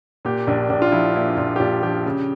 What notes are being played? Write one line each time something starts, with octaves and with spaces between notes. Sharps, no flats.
A#2 G4
A#1 D4
A#1 D4
F4
F3 E4
A#2 E4
A#1 F4
G4
A#1 F4
F3 G4
C#3